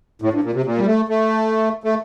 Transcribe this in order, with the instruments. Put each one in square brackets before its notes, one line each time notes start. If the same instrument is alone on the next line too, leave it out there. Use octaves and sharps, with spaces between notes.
[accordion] A2
G2
A#2
C3
A#2
G3
A3
A3
A3